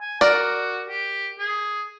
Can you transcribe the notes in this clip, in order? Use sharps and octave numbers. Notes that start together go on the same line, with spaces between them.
G#5
F#4 A#4 D5
G4
G#4